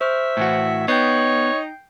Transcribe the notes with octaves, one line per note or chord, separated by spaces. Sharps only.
C5 E5 C#6 F6
A2 E3 F#4
B3 D#4 C#5 G5 G6 C7